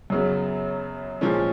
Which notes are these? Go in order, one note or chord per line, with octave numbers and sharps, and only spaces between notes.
F#2 C#3 F#3 B3
A#2 F3 G#3 C#4